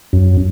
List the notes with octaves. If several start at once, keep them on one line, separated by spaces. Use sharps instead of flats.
F#2